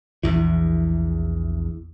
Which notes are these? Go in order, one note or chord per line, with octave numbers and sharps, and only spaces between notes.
A#1 E2 E3